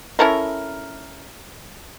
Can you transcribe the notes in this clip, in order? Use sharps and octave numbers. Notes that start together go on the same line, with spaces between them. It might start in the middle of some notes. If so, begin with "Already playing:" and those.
C#4 E4 A4 A#4